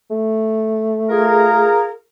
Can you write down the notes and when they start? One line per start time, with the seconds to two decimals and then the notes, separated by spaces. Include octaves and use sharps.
0.12 A3
1.09 F4 G#4 A#4